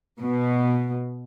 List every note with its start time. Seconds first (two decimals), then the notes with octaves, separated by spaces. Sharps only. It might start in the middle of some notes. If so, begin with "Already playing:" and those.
0.20 B2